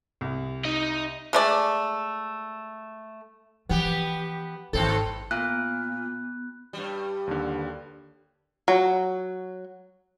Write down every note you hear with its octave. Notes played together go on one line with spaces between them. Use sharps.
C2
D#4 D#5
G#3 A3 D5
E3 F3 B3 G4
G#1 D#2 C4 A4
A#2 B3 F#6
G2 G3
D#2 D3
F#3